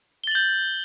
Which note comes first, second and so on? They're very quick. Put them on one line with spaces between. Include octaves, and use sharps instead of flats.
G7 A6 F#7 G6